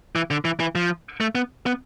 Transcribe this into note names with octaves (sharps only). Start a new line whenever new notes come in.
E3
D3
E3
E3
F3
A3
B3
B3